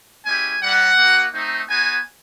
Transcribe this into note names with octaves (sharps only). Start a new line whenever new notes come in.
G#3 C#4 E4 G4 G#5
G3 A#3 D#4 F#5
A#3 D#4 F#4
A3 C4 D#4
B3 D#4 F#4 G#5